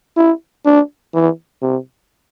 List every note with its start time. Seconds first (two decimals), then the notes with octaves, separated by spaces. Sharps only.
0.17 E4
0.65 D4
1.14 E3
1.62 C3